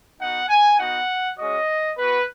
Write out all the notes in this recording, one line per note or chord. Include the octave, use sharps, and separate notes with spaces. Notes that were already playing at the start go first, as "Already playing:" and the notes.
B3 D#4 F#4 F#5
G#5
B3 D#4 F#4 F#5
G#3 C#4 F#4 D#5
B3 F#4 B4